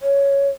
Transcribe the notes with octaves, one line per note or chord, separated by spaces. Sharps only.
C#5